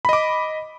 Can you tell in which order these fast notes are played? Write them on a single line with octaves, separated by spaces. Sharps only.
B5 D#5 D6